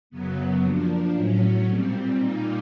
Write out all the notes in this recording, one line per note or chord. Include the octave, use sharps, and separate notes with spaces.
F#2 C#3 F#3 B3
F3 A#3 D4
A2 F#3 A3 C#4
A#2 G3 C4
A#2 G3 A#3 D#4